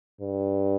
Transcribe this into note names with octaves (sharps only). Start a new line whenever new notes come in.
G2